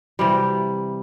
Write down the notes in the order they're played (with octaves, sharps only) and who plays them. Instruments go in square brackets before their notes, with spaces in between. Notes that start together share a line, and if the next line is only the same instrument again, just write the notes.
[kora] C3 E3 G3